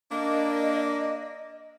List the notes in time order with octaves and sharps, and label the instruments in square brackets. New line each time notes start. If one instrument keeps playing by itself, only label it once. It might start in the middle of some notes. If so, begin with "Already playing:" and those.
[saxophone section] A#3 D4 [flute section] D#5